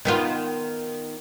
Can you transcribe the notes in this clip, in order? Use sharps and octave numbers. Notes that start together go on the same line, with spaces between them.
D#3 B3 F4